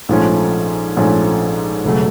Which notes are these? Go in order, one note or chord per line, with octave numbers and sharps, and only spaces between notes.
A#1 G#2 F3 A3 C#4
A#1 G#2 F3 A3 C#4
E1 C#3 F#3 A3